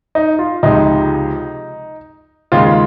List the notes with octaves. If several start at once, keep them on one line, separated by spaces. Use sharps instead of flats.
D#4
F4
C#2 C3 F3 G#3 D#4
D#2 C#3 G#3 F4